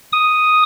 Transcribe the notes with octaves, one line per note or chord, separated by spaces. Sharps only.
D#6